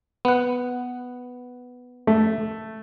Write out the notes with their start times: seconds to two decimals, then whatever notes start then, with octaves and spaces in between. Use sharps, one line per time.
0.25 B3 F#5
2.07 A3